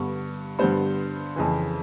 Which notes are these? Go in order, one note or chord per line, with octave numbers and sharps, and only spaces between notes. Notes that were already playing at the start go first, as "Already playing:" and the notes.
Already playing: G2 D3 G3 B3 C#6
G2 D3 G3 B3 C5 C6
F2 C#3 E3